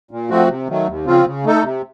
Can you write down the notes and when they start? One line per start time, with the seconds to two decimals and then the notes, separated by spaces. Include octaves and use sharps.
0.11 A#2
0.30 F3 A3 C4 F#4
0.49 C3
0.68 D#3 F#3 A3
0.87 D#2
1.06 C#3 F3 C4 F4
1.26 C#3
1.44 A3 D#4 A4
1.63 C3